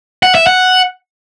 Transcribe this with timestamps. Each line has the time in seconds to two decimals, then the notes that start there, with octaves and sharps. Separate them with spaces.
0.23 F#5
0.35 E5
0.47 F#5